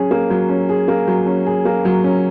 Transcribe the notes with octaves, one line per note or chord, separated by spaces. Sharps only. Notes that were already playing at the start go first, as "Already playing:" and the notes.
Already playing: F#3 C#4 G#4
A#3
F#3
C#4
G#4
A#3
F#3
C#4
G#4
A#3
F#3
C#4